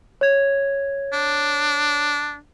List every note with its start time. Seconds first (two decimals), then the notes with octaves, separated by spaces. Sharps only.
0.21 C#5 G#6
1.13 D4